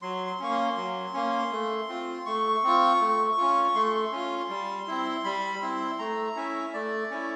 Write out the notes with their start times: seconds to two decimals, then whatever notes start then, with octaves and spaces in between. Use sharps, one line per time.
0.02 F#3 C6
0.27 C6
0.39 A#3 C#4 C#6
0.51 C6
0.77 F#3
1.13 A#3 C#4
1.51 A3
1.89 C4 F4
2.26 A3 C#6
2.63 C4 F4
3.00 A3
3.37 C#4 F4
3.75 A3 C6
4.12 C#4 F4
4.49 G3
4.87 C4 E4
5.24 G3 B5
5.61 C4 E4 C6
5.99 A3 A#5
6.36 C#4 E4 E5
6.73 A3 D5
7.11 C#4 E4